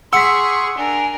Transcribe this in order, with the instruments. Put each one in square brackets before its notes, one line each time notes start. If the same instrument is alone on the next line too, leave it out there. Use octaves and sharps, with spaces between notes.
[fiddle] G#4 C#6 [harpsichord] F#5 [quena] C6 [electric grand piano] E6 B6
[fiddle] D4 A#4 [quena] G#5